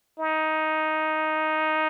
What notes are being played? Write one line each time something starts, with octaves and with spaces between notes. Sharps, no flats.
D#4